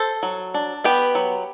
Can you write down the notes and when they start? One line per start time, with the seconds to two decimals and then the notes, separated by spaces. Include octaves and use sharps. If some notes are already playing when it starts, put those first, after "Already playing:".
Already playing: A4 C5
0.23 F#3
0.54 D4
0.84 B3 G4 B4
1.15 F#3